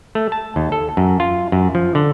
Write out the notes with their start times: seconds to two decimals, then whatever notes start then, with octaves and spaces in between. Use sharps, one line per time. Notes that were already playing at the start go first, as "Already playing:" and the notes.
0.15 A3
0.32 A5
0.56 D#2
0.72 A4
0.97 F#2
1.20 F4
1.52 F#2
1.75 F3
1.95 D3